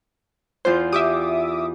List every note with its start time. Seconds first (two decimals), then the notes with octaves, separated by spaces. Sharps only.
0.65 E2 F4 C5 G6
0.93 G4 E5 D6 D#6